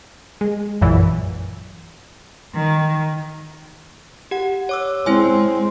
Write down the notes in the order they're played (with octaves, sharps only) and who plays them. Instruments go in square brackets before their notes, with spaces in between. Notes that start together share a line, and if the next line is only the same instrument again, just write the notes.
[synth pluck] G#3
A#1 F#2 A#2 E3
[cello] D#3
[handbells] G4 F#5
C#5 D6 E6
[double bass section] G#3 [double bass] C4 [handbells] E4 C#5 G#5